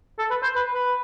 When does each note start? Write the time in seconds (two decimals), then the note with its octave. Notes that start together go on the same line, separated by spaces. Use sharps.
0.19 A4
0.30 B4
0.43 C5
0.56 B4
0.74 B4